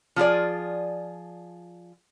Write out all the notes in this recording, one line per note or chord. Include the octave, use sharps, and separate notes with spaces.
F3 F4 G#4 D5